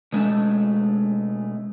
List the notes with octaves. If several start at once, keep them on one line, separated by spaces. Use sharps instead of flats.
B2 G#3 A3 C#4 A5